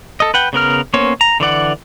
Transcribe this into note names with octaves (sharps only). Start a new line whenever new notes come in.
A4 D#5
B4 F#5 G5
C#3 B3 A#4 F6
A#3 B3 C#4 C5 C#5
A#5
D3 E3 D5 F#5